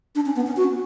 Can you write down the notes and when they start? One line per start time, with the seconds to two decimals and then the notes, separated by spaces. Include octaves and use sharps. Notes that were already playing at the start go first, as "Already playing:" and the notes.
0.15 D4
0.26 C#4
0.36 B3
0.47 C#4
0.57 F#4